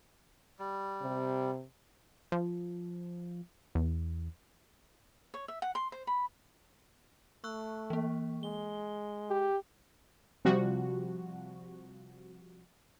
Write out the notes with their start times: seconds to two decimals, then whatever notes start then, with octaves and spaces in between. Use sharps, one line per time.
0.59 G3
1.02 C3
2.32 F3
3.75 E2
5.34 C#5
5.48 E5
5.62 F#5
5.75 C6
5.92 C5
6.07 B5
7.44 A3 C#6 E6 F#6
7.90 E3 A#3
8.43 G#3 G7
9.30 G4
10.45 C3 F3 G3 F#4